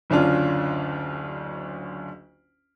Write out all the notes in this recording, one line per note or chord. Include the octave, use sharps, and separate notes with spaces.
F#1 D2 C#4 D4 F4